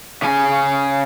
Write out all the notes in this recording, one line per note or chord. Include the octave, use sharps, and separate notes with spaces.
C#3 G#5